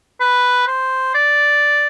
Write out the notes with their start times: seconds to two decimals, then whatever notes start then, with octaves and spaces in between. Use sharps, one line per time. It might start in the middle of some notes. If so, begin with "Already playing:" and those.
0.20 B4
0.67 C5
1.14 D5